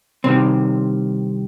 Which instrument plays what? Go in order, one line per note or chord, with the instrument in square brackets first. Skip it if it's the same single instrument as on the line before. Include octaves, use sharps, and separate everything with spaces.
[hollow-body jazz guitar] C2 C3 D#3 C4